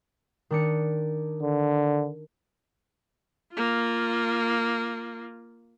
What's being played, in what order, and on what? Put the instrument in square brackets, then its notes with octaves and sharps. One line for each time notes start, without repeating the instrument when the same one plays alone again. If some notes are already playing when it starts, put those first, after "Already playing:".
[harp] D#3 D4 C#7
[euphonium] D3
[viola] A#3 F4